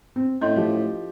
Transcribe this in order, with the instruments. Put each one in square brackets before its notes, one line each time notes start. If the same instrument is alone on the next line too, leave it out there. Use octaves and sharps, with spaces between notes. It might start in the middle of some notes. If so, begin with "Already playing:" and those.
[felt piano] C4
[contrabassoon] A2 [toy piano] C#4 D#5 C6 [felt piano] G6
[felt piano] F3 G4